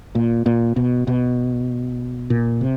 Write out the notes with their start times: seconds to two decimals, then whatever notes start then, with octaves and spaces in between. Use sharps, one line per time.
0.15 A#2
0.46 A#2
0.76 B2
1.07 B2
2.30 A#2
2.61 C3